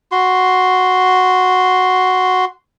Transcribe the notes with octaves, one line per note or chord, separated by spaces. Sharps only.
F#4 C6